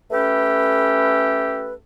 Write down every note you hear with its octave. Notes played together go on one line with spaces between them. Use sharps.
A3 C#4 G4 A4 B4